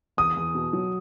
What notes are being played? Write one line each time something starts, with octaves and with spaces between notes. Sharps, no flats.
E2 D#6
E2
B2
F#3